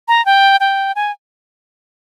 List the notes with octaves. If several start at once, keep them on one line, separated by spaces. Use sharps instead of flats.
A#5
G5
G5
G#5